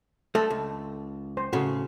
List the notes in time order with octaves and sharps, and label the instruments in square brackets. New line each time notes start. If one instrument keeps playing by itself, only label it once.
[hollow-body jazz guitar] A3 [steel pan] A4
[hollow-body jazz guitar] C#2
[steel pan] C5
[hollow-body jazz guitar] A2 C#3 [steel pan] F#4